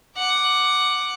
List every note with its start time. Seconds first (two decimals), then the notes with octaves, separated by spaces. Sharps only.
0.17 F#5 D6